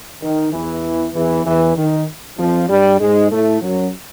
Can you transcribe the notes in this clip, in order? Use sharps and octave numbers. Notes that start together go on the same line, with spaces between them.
D#3
E2 E3
E2 E3
E2 E3
D#3
F2 F3
G2 G3
G#2 G#3
A2 A3
F#2 F#3